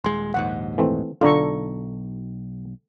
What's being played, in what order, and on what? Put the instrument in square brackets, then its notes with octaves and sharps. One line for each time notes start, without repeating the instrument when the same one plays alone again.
[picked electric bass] D#1 G#3 [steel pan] C6
[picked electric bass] A#1 D#2 G#2 [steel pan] F#5
[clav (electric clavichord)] E3 A3 C4
[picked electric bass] B1 [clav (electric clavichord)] D3 D4 F4 [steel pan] A4 A#5 C#6